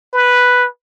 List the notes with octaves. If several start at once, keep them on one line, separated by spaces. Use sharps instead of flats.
B4